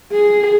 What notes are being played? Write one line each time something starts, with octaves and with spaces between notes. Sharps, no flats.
G#4